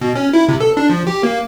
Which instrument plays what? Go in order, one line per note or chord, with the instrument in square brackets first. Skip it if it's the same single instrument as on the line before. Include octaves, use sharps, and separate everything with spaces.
[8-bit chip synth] B2
C#4
E4
C3
A4
D4
F3
G4
A#3